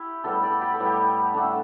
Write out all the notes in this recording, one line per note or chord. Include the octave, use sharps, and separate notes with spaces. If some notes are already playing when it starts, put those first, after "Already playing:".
Already playing: E4 G4
A2 G3 B3 A4
D5
G4
A4
A2 G3 B3
G4
D3 A3 D4